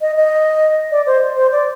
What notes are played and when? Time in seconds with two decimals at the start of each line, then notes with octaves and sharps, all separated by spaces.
0.01 D#5
0.17 D#5
0.91 D5
1.06 C5
1.37 C5
1.52 D5